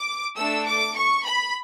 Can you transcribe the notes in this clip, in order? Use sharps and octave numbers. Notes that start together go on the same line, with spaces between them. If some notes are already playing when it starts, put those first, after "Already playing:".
Already playing: D6
A3 D4 A4 E6
D6
C#6
B5